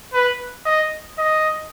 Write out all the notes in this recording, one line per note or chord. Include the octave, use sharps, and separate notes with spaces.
B4
D#5
D#5